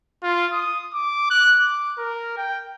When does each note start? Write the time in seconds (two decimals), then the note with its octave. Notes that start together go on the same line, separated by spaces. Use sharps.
0.23 F4
0.53 D#6
0.93 D6
1.30 F#6
1.61 D6
1.98 A#4
2.37 G5